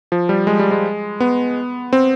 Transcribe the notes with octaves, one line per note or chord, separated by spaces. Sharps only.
F3
G3
G#3
G3
G#3
B3
C4